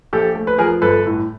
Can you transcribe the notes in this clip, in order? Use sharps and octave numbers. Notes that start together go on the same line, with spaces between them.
A#1 G4 A4
A3
B4
F3 G#4 A#4
G1 A4 B4
A2